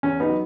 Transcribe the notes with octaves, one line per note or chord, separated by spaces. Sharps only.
E2 C#4
B3 D#4
F#3